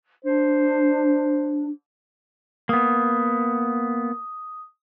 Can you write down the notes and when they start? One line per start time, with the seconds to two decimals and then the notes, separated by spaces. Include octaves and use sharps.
0.25 D4 C5
2.69 A#3 B3 D#6